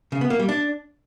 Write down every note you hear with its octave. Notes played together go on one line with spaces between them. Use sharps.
C#3
B3
A#3
G3
D4